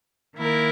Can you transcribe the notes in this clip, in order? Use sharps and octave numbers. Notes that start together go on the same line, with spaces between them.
D#3 A#3 E4 A#4